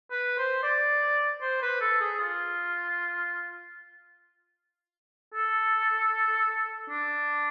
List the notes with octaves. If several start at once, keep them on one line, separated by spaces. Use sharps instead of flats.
B4
C5
D5
C5
B4
A4
G#4
F4
A4
D4